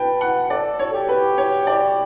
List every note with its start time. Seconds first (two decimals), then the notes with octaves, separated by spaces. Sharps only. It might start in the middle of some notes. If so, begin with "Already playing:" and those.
Already playing: B4 G5 A5
0.21 F#5
0.50 A4 D5
0.79 C#5
0.94 G4
1.08 B4
1.38 C#5
1.67 D5